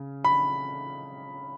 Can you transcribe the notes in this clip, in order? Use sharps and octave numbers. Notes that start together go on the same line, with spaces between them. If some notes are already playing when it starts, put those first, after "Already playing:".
Already playing: C#3 C#4
B5